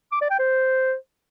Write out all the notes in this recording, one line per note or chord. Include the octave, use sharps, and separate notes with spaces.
D6
D5
G5
C5